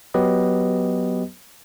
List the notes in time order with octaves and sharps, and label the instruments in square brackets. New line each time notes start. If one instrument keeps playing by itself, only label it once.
[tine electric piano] F#3 B3 G4 B4 D#5